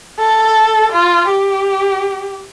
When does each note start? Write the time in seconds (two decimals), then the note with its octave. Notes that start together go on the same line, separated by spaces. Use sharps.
0.19 A4
0.92 F4
1.28 G4